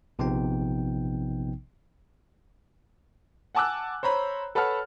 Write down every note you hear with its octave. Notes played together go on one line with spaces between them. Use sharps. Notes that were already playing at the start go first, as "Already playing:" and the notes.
A#1 C3 F3 B3 D#4 G5
F#5 G#5 A5 D6 E6 F#6
C5 C#5 A#5 B5
A4 B4 C#5 F#5 A5 F6